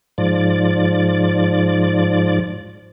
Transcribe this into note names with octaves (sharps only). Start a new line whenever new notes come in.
G#2 F3 D5